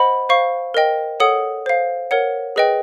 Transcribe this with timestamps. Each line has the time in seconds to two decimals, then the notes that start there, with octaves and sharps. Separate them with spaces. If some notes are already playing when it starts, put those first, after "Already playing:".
Already playing: C5 D#5 F#5 B5
0.29 C5 F5 C#6
0.74 A#4 D#5 G5
1.20 A4 C#5 F#5 D#6
1.66 C5 F5
2.11 A#4 C#5 F#5
2.56 G#4 B4 D#5 G5